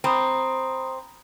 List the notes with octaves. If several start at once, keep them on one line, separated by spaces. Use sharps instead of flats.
C4 A#5 B5 D#6